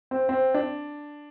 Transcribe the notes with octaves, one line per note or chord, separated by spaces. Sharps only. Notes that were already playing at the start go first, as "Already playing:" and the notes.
C4
C4
D4